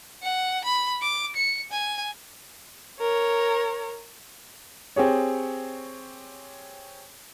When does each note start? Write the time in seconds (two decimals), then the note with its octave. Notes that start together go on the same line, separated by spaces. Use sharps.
0.23 F#5
0.64 B5
1.02 D6
1.36 C#7
1.71 G#5
3.01 A#4 C#5
4.96 C4 G4 G#4 C#5